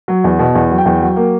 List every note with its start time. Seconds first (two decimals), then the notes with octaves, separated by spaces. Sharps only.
0.08 F#3
0.24 E2
0.39 B2
0.55 E2
0.70 F#3
0.78 G5
0.86 E2
1.01 F#3
1.17 A#3